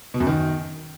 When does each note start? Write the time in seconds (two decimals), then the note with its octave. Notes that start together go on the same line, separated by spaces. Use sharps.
0.14 B2
0.20 F#2
0.27 D#3